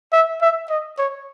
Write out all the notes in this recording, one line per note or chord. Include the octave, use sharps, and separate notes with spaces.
E5
E5
D#5
C#5